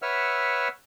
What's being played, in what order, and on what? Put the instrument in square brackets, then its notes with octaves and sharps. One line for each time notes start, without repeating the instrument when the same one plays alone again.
[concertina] B4 C#5 E5 F#5 E6 F6